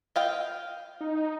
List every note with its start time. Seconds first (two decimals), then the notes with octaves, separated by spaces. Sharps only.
0.16 D#5 F5 G5
1.01 D#4